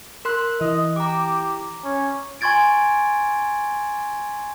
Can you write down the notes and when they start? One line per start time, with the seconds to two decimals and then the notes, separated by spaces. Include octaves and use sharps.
0.25 A#4 C6 F#6
0.61 E3 D#5
0.96 G4 A#5 D6
1.84 C#4
2.41 G#5 C6 C#6 G#6 A6 D7